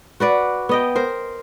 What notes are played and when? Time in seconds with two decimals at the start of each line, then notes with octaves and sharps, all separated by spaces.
0.20 F#4 B4 D5 F#5
0.69 B3 D#5 G5
0.96 A#4 C5